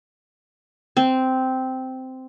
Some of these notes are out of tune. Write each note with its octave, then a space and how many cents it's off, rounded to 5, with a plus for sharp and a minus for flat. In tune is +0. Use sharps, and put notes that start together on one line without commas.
C4 -10